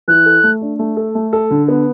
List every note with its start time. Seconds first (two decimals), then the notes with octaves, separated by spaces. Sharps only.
0.08 E3 F#6
0.26 A4
0.43 A3
0.61 D4
0.79 A3
0.97 A4
1.15 A3
1.33 A4
1.51 D3
1.68 B3